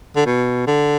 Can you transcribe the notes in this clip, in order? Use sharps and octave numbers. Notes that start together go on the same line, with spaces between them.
D3
B2
D3